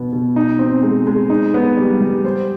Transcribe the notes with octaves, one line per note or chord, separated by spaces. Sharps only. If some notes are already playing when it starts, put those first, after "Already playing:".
Already playing: B2 B3
B2
D#4
C4
G#3
G#3
D#4
B3
G3
G3
C5